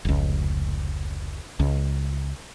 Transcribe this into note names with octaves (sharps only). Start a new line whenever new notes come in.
F1 C#2
C#2